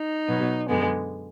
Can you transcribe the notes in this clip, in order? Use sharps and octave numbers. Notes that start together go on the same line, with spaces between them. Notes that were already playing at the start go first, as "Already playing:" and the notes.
Already playing: D#4
B2 F#3 B3
F#2 D3 G#3 B3